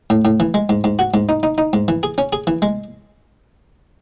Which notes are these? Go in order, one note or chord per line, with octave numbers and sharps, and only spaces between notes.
A2
A2
E3
G#3
G#2
G#2
F#4
G#2
D#4
D#4
D#4
G#2
E3
G#4
C#4
G#4
E3
G#3